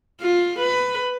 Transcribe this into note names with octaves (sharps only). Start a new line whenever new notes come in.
F4
B4